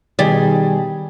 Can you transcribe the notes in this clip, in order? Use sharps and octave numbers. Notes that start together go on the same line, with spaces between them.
B2 D#3 G3 G#4